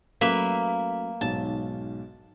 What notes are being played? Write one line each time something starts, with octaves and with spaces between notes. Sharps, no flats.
F#3 A3 A#3 C#4 B4 E5
B1 G#2 A5